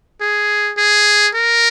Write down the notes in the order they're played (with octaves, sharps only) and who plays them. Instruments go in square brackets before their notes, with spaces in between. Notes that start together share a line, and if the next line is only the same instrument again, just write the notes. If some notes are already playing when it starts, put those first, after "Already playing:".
[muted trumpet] G#4
G#4
A#4